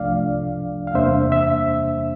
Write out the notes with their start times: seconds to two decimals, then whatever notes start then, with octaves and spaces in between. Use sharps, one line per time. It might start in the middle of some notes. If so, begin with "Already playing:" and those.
Already playing: C2 C3 F3 A3 D4 D5 F5
0.87 F5
0.94 E2 C3 G3 A#3 D4 C5 E5
1.32 E5